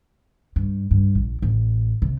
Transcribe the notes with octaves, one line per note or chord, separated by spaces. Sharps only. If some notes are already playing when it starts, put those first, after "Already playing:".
G2
G2
A#1
A1
C3